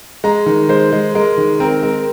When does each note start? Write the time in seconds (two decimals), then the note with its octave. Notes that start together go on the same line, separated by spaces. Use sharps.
0.24 G#3 A#5
0.46 D#3
0.69 G#3 C5
0.93 G#3
1.15 G#3 A#4
1.37 D#3
1.60 C4 A#4
1.83 G#3 A#4